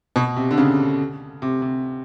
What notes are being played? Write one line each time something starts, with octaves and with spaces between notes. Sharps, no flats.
B2
C3
D3
C#3
C3
C3